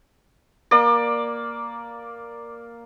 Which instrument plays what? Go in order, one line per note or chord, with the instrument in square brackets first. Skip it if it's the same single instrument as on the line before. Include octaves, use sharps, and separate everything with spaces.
[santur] A#3 D5